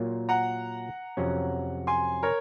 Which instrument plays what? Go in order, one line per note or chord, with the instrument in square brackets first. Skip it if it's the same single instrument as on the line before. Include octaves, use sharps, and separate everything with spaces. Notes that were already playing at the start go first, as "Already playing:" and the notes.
Already playing: [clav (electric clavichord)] A#2 F#3 A#3 F4
[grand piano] F#5 A#5
[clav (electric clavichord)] F2 C3 F#3 C#4
[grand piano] G#5 C6
A#4 C#5